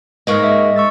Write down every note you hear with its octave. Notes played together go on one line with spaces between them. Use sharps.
G#2 G#3 A#3 D#5 C#6 F6
D#5 E5
C#6 E6 A6